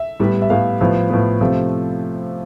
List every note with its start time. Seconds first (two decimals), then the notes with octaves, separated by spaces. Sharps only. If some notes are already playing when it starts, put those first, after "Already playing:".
Already playing: E5
0.20 A2 G3 B3
0.42 E5
0.50 A2 G3 B3 F5
0.81 A2 F3 B3
1.10 A2 F3 B3
1.41 C3 F3 A3